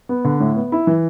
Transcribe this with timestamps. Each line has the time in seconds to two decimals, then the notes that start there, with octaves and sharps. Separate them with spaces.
0.09 B3
0.25 D3
0.40 A2
0.56 B3
0.72 E4
0.87 E3